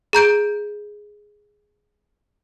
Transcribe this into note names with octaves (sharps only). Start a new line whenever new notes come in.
G#4 A#5 G6 D7